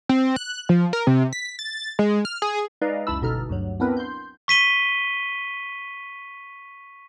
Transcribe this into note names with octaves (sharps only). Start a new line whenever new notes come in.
C4
F#6
F3
A#4
C3
B6
A6
G#3
F6
G#4
G#3 D#4 B4 D5 D#5 F5
C#2 F#2 E4 A5 B5 E6
G1 B2 D#4 A4 F6
D2 G2 F#3
B3 C4 D4 E4 A#4 B4
C6 G6
C#6 B6 D#7 G7